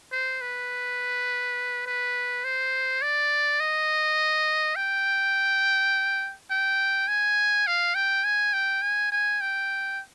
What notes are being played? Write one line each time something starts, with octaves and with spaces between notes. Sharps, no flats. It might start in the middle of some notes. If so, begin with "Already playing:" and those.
C5
B4
B4
C5
D5
D#5
G5
G5
G#5
F5
G5
G#5
G5
G#5
G#5
G5